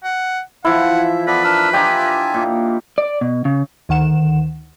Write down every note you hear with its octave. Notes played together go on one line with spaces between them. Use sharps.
F#5
E3 F3 E4 E5 F#5
B3 A4 B4 D5
D4 A#4 E6
D4 F4 G4 D#5 E5 G5 G#5 A#5
A#2
D5
B2
C#3
D2 D#3 F#5 E7